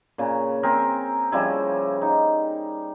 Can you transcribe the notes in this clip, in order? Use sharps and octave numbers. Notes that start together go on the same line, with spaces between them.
A#2 C#3
C4 G#4 A#4
C#3 F3 G3 E4
D#4